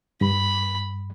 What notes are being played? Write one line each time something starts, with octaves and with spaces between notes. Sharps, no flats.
G2 B5